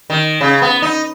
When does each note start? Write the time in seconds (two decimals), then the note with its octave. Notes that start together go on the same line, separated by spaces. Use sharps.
0.10 D#3
0.41 C#3
0.62 B3
0.82 D#4